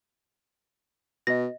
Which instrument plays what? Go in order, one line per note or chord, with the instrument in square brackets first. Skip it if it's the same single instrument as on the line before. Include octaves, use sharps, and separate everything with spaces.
[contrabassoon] B2 [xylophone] D#5 A#6